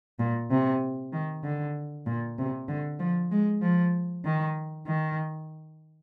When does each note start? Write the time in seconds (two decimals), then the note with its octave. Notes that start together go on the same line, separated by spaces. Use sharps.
0.19 A#2
0.51 C3
1.13 D#3
1.44 D3
2.06 A#2
2.38 C3
2.68 D3
3.00 F3
3.31 G#3
3.62 F3
4.25 D#3
4.87 D#3